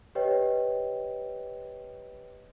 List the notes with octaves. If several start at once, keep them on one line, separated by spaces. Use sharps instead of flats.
G4 B4 C#5 D#5 G5